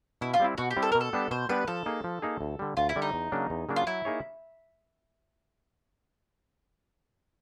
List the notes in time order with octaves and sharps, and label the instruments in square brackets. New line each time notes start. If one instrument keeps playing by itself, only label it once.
[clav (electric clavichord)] B2 [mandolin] E4
[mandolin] F4
[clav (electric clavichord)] G3 C4 E4
[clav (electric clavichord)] B2 [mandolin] F#4
[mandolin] G4
[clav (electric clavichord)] G3 C4 E4
[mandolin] A4
[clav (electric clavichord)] B2 [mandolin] A#4
[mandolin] A4
[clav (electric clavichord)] G3 B3 D4 G4
[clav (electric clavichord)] B2 [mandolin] C5
[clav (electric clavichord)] G3 B3 D4 G4 [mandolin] B4
[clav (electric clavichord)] F3 [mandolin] A4
[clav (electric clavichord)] A#3 D#4 G#4
F3
A#3 D#4 G#4
D2
D3 G3
[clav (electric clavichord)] D2 [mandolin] F4
[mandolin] E4
[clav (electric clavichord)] D3 G3
[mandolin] D#4
[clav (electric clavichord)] E2
C#3 F#3 A#3 D4
E2
C#3 F#3 A#3 D4
[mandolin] F4
[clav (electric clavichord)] F#3 [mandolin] E4
[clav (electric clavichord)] A#3 D#4 G#4 C#5